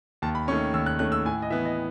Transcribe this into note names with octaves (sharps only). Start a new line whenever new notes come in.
D#2 A5
B5
D#3 A3 C#4 C#6
D#2 E6
F#6
D#3 A3 C#4 F#6
E6
A2 G#5
D#5
E3 B3 E5
D#5